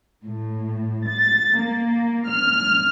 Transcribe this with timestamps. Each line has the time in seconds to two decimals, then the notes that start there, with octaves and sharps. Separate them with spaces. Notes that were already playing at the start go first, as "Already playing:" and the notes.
0.24 A2
1.06 A6
1.58 A#3
2.29 F6